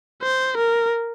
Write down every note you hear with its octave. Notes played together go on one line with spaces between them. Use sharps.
C5
A#4